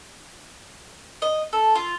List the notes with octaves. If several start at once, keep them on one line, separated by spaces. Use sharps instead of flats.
D#5
A4
F4